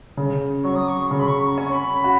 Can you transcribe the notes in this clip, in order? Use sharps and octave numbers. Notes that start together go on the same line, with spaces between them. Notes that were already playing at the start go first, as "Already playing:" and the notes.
C#3
F#3 C#6
D#6
C#6
C#3 C#6
B5
C#6
C#6
C#4
C#6
B5
F#4